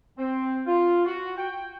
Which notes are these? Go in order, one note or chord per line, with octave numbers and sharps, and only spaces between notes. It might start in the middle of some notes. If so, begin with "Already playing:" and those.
C4
F4
F#4
G5